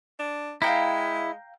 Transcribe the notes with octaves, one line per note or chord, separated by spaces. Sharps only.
D4
G#3 E4 F5 G5 A#5